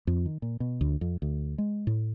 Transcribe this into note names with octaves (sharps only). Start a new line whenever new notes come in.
F2
D#3
A#2
B2
D2
F2
D2
G#3
A2